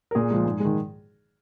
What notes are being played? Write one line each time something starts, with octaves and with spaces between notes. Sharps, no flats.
A#4
A#2 G#4
F3 G#3
G#2
D#3 G#3